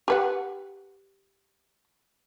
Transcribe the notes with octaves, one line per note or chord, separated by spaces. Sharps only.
G4 B4 F#5